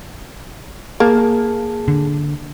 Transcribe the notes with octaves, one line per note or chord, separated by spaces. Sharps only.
A#3 G#4 A5
D3